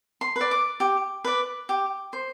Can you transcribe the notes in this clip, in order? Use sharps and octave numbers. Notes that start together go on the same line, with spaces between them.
C6
B4
D5
D6
G4
B4 D5
G4
C5